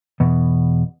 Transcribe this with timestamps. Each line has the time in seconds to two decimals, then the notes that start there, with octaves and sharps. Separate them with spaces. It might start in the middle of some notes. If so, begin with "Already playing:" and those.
0.20 E2 B2